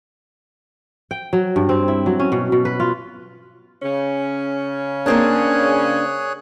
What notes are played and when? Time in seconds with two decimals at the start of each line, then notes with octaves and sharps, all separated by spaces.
1.11 G5
1.33 F#3
1.56 G2
1.69 C4
1.88 E4
2.06 F#3
2.19 C#4
2.32 B2
2.52 B2
2.65 B4
2.80 F4
3.82 C#3 C#4
5.06 A#3 C4 D4 G#4 C#5 F#6